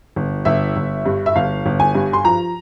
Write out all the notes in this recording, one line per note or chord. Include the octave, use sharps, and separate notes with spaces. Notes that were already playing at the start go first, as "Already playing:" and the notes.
G1
G1 E5
G1
G2
E5
G1 F5
G1
G#5
G2
C6
F3 A#5